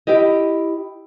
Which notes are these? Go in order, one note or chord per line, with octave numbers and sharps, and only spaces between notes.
E4 G4 D#5